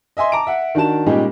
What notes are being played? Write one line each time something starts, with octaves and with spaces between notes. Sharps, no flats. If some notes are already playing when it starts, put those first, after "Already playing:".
D#5 E5 G#5 C6
A5 A#5 D6 D7
E5 F#5
D#3 D4 F#4 A5 E7
A#2 G3 G#3 C#4 D#4 G4